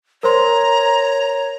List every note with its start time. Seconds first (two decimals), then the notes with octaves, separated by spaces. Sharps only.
0.23 A#4 C5 C#5 A#5 C6